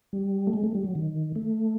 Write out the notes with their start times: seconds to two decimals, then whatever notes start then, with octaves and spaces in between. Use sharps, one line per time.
0.13 G3
0.47 A3
0.53 G#3
0.64 A3
0.74 G3
0.84 F#3
0.95 D#3
1.36 A3